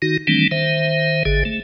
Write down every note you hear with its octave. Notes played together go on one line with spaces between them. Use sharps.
D#3 D#4 F#4
D#3 E3 G3 A3 C4 D4
D#3 C5 E5
G#1 D3 G#4
A3